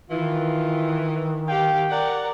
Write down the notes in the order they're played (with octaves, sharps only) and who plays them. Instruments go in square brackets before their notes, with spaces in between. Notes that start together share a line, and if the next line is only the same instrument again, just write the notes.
[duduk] D#3 [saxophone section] E3 [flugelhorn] F4
[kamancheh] G4 F5 [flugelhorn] G5
[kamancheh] A#4 D5 [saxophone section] F#5